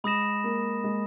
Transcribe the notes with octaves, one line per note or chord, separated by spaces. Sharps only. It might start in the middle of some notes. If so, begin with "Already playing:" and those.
G#3 B5 D#6 A#6 E7
A#3
G#3